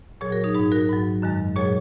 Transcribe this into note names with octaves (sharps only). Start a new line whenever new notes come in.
A#2 F#3 G#4 C#5
F#4 A#4
D#4 G#4
G#2 F#3 D#4 G#4
F#4 A#4
G#2 F#3
F#2 D#3 G#3
A#2 F#3 G#4 C#5